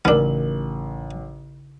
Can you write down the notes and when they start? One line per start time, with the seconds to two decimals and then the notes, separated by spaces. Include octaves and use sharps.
0.05 A1 C#3 B3 D4 D#4 A#4 F#7